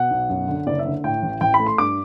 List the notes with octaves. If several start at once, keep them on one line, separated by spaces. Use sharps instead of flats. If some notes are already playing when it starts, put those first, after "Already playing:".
Already playing: B2 F#5
B1
F#2
D3
F#1 D5
E5
D3
A2 G5
A1
A1 G5
B5
A3
C6
G2 D6